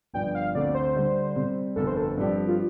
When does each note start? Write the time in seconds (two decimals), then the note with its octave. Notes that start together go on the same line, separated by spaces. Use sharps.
0.13 G1 G2 F3 D4 G5
0.35 F5
0.55 D2 C3 A3 C4 D5
0.74 C5
0.95 D3 G3 D4
1.36 C3 G3 C4
1.76 G1 F2 C3 A4
1.87 C5
1.97 A4
2.17 G2 F3 C4 G4 D5
2.48 F4